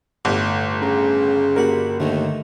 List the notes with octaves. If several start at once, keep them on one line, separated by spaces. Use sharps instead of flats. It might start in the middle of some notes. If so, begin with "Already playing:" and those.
G1 A2
C#3 A#5
G3 A#3 F#4 A#4 F#5 B5
D#2 D3 D#3 A3